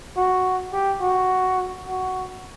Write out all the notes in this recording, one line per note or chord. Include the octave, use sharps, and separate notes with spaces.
F#4
G4
F#4
F#4